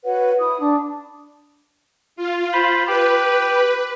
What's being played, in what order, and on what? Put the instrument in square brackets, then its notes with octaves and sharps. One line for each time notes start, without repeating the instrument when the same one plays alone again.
[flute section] F#4 B4 C#5 F#5
E4 D#6
D4
[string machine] F4
[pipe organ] C5 B5
[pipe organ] G4 [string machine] B4